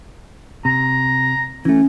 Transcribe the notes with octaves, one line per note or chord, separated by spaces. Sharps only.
C3 A#5
E3 A3 C#4